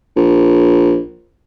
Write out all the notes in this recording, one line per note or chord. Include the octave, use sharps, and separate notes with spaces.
A#1